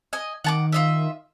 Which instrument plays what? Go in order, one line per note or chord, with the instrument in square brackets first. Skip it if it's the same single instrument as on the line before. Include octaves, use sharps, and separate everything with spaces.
[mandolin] D#5 G#5
[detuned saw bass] D#3 [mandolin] F#5 A5 D6
[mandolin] F4 D#5 E5